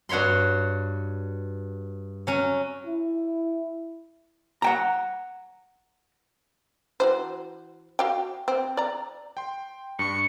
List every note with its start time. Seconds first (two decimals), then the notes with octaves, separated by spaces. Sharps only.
0.09 G2 F#4 C#5 B5 C6
2.27 F#3 C#4
2.86 E4
4.62 F#5 G5 A#5
7.00 E3 F#4 C5
7.99 F#4 F5 G5
8.48 C4
8.77 D5 A#5
9.37 G5 C6
9.99 G2 D4 C#6 C#7